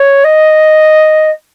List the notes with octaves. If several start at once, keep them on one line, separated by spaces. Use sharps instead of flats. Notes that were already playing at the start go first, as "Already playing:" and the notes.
Already playing: C#5
D#5